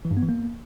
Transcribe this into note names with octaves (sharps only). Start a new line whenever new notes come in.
E3
G2
B3
E3
A#3